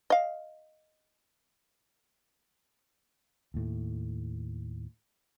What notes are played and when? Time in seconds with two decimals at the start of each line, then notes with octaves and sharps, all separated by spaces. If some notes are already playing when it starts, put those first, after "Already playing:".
0.10 D#5 F5
3.54 D#2 A2